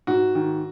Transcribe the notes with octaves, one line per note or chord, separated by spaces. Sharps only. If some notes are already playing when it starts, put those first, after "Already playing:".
G#2 F#4
D#3